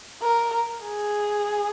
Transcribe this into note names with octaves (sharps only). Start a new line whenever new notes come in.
A#4
G#4